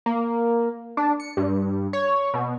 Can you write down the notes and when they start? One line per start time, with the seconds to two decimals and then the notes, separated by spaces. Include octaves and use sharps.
0.06 A#3
0.97 D4
1.20 C#7
1.37 G2
1.93 C#5
2.34 B2